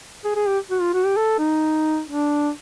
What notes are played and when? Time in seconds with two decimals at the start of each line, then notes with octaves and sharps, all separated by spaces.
0.25 G#4
0.35 G#4
0.48 G4
0.71 F#4
0.81 F4
0.94 F#4
1.05 G4
1.17 A4
1.39 D#4
2.08 D4